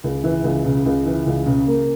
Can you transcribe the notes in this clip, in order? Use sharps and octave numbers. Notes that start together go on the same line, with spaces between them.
C#2
E3
C#2
C#3
C#2
E3
C#2
C#3
A#3